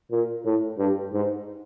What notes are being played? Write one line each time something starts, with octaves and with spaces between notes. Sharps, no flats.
A#2
A2
G2
G#2